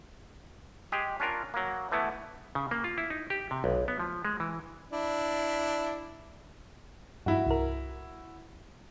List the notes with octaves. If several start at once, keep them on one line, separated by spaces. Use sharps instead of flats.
G#3 G4 G#4
C#4 D4 F4 A#4
F#3 A#3
E3 A3 B3 E4
C#3
A#3
F4
E4
D#4
G4
C3
B1
B3
F3
G#3
E3
D4 E4
G2 E4 F#4
C2 A#4